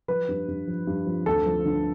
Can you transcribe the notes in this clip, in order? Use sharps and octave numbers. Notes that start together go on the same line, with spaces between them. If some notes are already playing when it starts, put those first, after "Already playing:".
F3 B4
G2
G2
F3
G2
F3
D2 A4
F3
D3